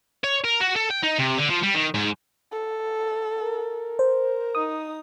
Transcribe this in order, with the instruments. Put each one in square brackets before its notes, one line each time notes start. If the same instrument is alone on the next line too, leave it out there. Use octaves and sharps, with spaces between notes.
[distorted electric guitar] C#5
A#4
F#4
A4
G5
D#4
C3
D3
F3
G3
D#3
G#2
[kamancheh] A4
[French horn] A#4
[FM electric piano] C5
[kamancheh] D#4 [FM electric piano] D#6